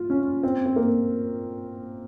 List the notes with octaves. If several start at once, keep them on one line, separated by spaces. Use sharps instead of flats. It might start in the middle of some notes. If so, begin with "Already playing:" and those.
Already playing: F4
C#4
C4
C4
A#3